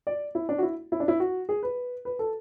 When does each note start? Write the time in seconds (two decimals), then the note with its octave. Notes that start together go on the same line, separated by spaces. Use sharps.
0.07 D5
0.35 E4
0.49 D4
0.58 F#4
0.63 E4
0.92 E4
1.00 D4
1.08 E4
1.20 F#4
1.49 G#4
1.63 B4
2.05 B4
2.19 A4